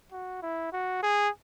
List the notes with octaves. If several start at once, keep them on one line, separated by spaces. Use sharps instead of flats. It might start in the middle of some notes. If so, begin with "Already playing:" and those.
F#4
E4
F#4
G#4